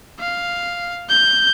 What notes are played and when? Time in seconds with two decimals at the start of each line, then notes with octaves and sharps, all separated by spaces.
0.20 F5
1.09 G6